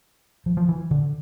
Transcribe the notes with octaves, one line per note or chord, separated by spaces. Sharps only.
F3
F3
E3
D3